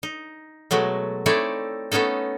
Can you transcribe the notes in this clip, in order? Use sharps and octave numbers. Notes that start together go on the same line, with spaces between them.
D#4
B2 F#3 G#3 A3
A3 C4 D#4 E4 C#5 D5
A3 B3 C#4 D#4 A4